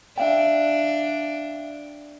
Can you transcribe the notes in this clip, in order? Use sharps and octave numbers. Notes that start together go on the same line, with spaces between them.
D4 E5 F5 G5